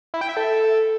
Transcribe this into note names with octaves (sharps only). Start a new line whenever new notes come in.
E4
G5
E5
A4